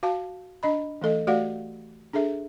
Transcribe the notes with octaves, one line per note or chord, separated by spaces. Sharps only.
F#4 F5 A5
D4 D#5 B5
E3 A3 A4 D#5
A3 F#4 G4 D5 F5 F#5
D4 G#4 A4 E5